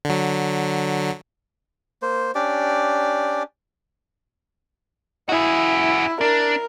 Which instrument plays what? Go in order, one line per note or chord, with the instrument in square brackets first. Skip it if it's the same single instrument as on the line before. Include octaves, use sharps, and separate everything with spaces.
[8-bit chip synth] D3 F#3
[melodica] A#3 C5
C#4 D4 G4 D5
[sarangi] E4 [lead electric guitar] F#4 G#4
[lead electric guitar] D4 [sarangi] A#4